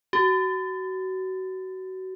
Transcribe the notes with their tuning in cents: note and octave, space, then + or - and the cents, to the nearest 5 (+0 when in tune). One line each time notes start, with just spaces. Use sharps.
F#4 +25